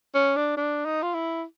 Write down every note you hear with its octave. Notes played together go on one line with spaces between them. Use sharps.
C#4
D4
D4
D#4
F4
E4